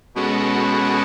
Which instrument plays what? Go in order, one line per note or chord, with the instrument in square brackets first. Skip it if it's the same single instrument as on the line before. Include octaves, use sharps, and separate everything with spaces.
[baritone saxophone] B2 [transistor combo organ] G#3 C#4 F#4 A4